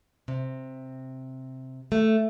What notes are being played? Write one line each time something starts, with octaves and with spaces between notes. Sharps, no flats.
C3
A3